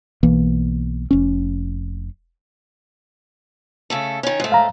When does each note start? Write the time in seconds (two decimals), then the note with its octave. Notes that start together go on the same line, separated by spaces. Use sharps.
0.23 B1 E3 A#3
1.11 F1 C#4
3.90 C#3 A3 A4
4.23 D#3 C#4
4.40 G#2 A3
4.52 F5 A#5